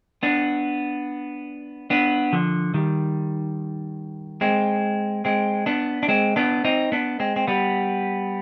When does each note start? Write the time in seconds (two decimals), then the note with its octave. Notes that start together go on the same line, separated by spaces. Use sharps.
0.23 B3 D4
1.90 B3 D4
2.33 D3 F3
2.74 D#3 G3
4.41 G#3 C4
5.25 G#3 C4
5.66 B3 D4
6.03 D4
6.08 G#3 C4
6.36 B3 D4
6.65 C4 D#4
6.92 B3 D4
7.20 G#3 C4
7.36 C4
7.47 G3 B3